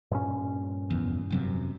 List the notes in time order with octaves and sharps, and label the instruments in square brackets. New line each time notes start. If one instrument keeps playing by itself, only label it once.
[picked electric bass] G2 A#2 C#4
[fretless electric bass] F1 E2
F1 F#2 C3